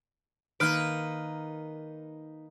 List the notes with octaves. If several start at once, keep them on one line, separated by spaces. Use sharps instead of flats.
D#3 A#3 D#4 B4 F6 D7